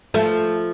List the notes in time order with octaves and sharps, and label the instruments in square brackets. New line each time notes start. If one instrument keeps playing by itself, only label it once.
[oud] F3 A3